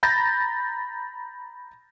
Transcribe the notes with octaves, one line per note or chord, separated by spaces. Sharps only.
A#5 B5 G6 A6 A#6